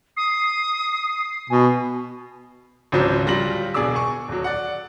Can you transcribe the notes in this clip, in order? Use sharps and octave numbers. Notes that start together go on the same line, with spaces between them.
D#6 C7
B2 G#5
G#1 C#2 C#3 F3 F#3 C5
D1 F#3 G3 F4 A#6 F#7
E1 B2 G#4 D5 D6 E6
G#5 C#6
D#1 F#3
D5 F#5